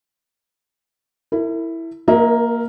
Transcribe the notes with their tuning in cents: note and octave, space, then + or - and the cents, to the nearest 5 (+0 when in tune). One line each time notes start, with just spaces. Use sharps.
E4 +0 A#4 -45
A#3 +0 A#4 +35 E5 -40